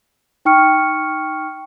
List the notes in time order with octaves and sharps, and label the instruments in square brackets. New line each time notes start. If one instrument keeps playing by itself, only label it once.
[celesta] D#4 G5 C#6 F6 C#7